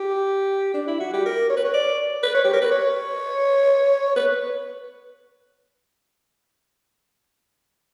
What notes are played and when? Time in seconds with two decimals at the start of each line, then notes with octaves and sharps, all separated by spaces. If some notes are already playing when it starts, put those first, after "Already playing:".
Already playing: G4
0.74 D4
0.87 E4
0.99 F#4
1.13 G4
1.25 A#4
1.49 C#5
1.56 B4
1.64 C#5
1.74 D5
2.23 B4
2.34 C#5
2.44 G4
2.53 A#4
2.61 B4
2.71 C#5
4.16 B4